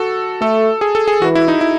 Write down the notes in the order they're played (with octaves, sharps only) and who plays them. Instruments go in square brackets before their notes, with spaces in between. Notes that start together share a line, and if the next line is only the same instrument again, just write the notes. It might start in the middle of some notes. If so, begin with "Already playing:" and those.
Already playing: [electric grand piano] F#4 A4
[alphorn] A3 [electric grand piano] A4
[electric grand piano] G#4
A4
G#4
[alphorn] E3 [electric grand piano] F#4
[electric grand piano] E4
D#4
E4